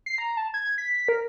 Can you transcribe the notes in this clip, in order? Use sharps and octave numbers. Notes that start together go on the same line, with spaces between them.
C7
A#5
A5
G#6
B6
A#4